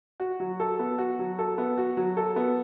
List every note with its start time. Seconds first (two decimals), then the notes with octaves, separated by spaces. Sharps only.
0.20 F#4
0.40 F#3
0.60 A4
0.79 B3
0.98 F#4
1.19 F#3
1.39 A4
1.58 B3
1.78 F#4
1.97 F#3
2.17 A4
2.36 B3